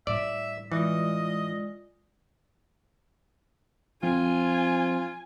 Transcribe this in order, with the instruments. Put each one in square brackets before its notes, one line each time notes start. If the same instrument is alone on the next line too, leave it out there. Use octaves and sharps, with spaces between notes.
[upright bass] A2 G3 [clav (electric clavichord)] D5 [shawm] E5
[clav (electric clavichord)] E3 [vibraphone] G#3 F4 D5 [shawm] D#5
[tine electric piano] F3 C4 [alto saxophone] F4 [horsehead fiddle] G#5